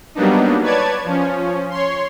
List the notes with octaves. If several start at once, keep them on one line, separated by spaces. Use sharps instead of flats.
F#3 G3 A#3 B3 D4 D#4
B4 C#5 D5 A5 G#6
F3 C#4
C#5 C6